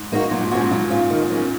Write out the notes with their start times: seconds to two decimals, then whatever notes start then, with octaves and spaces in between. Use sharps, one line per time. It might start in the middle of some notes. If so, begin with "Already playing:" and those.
Already playing: G#2
0.12 A#3 D#4 F#4
0.31 A#2 F#3
0.41 G#2
0.51 A#2 C#4 F#4
0.60 G#2
0.70 A#2 F#3
0.90 C#4 F4
1.10 D#3
1.30 F#3 A#3 C#4